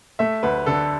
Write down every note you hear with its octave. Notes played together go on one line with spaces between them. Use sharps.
A3 E5
D2 B4
D3 A4